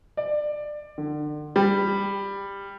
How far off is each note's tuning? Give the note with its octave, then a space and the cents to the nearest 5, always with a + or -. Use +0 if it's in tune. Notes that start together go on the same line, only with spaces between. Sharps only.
D5 +20
D3 +35
G3 +15